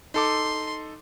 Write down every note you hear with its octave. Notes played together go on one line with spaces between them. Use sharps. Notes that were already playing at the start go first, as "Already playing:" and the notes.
D#4 A4 C6 D6